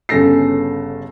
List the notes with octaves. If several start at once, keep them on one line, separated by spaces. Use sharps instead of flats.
G1 C#3 C#4 A4 A#6 C7